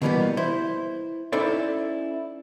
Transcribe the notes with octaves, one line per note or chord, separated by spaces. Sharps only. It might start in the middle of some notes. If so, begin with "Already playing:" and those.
B2 D3 E3 G3 A#3 B3
E4 C5
C#4 D#4 E4 A4 C5 D5